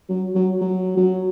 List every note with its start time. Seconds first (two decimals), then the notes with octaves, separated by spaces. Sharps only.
0.09 F#3
0.35 F#3
0.61 F#3
0.97 F#3